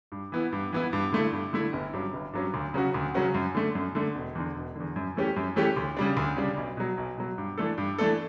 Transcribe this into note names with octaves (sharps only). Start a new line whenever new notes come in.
G2
E3 B3 E4
G2
E3 B3 E4
G2
D3 A3 E4
G2
D3 A3 E4
G1
G2 F#3 C#4
G1
G2 F#3 C#4
D2
C#3 F#3 C#4 F#4
D2
C#3 F#3 C#4 F#4
F#2
D3 A3
F#2
D3 A3
E1
E2 D3
E1
E2 D3
F#2
E3 A3 C#4 G4
F#2
E3 A3 C#4 G4
D2
C#3 G3 D4
D2
C#3 G3 D4
B1
B2 F#3
B1
B2 F#3
G2
E3 A3 D4 A4
G2
E3 A3 D4 A4